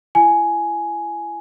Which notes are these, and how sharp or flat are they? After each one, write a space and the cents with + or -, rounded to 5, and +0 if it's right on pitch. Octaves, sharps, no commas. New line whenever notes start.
E4 +35 G#5 +10